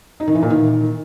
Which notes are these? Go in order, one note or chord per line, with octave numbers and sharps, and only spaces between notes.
D#4
D#3
E3
A#2
D#3